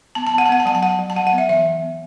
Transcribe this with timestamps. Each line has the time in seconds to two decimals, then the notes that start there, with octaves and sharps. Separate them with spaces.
0.15 B3 A5
0.27 A5
0.32 B3
0.38 F#5
0.46 A5
0.49 B3 F#5
0.60 A5
0.66 F#3 F#5
0.75 A5
0.83 F#3 F#5
0.99 F#3
1.10 A5
1.16 F#3 F#5
1.27 F#5
1.32 B3
1.38 E5
1.49 E3 E5
1.66 E3
1.82 B3